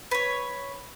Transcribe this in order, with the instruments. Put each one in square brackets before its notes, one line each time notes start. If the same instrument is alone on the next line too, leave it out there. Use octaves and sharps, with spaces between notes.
[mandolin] B4 C#5